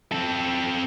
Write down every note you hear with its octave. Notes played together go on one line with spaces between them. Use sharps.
C4 A4